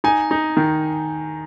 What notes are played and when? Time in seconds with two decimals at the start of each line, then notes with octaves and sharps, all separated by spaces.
0.04 D#4 G#5
0.31 D#4
0.57 D#3